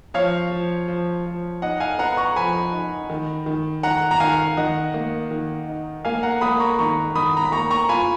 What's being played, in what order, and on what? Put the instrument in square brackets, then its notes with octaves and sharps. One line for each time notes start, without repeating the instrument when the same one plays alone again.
[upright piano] F3 [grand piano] C#5 F5
[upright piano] F3
F3
F3
[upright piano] D#4 [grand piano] D#5 F#5
[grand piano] F5 G#5
[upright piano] B3 [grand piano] F#5 A#5
[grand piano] A#5 C#6
[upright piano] F3 [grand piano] G#5 B5
[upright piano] D#4
D#3
D#3
[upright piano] D#3 [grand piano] F#5 A#5
[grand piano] A#5
[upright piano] D#3 [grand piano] F5 G#5
[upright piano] D#3 [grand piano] D#5 F#5
[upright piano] A#3
D#3
D#4
[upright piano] A#3 [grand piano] F5 G#5
[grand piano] F#5 A#5
[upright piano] A#3 [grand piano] B5 D#6
[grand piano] A#5 C#6
[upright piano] D#3 [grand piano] A#5 C#6
[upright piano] D#3 [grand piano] B5 D#6
[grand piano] A#5
B5
[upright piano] A#3 [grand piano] A#5 C#6
[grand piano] A#5 C#6
[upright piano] F4 [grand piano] G#5 B5